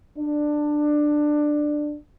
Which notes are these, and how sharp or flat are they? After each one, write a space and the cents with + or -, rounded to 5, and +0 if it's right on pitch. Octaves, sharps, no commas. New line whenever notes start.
D4 +15